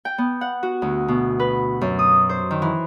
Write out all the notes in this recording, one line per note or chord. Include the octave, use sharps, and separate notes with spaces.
G5
B3
F#5
F#4
D2
B2
B4
F#2
D#6
C5
D#3
E3